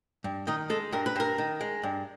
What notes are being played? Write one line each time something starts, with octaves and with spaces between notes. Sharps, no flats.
G2
D#3 D#4
G#3 A4
G2 A#4
B4
G2 A#4
D#3
G#3
G2